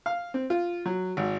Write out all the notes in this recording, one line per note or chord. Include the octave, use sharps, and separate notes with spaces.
F5
C4
F4
F#3
G#1